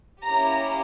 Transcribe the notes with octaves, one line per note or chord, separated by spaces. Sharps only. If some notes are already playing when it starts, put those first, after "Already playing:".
A#3 C#4 E4 G4 A#5